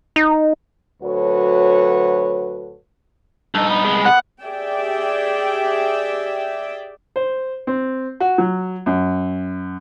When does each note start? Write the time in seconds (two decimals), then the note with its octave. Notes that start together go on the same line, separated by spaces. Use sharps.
0.16 D#4
1.03 D2 F#3 F#4 A4 B4 C#5
3.55 G2 D#4 A4
3.69 B3
3.85 C2 G#3
4.05 F#5
4.42 G4 G#4 D5 E5 G5
7.16 C5
7.67 C4
8.20 F#4
8.38 F#3
8.86 F#2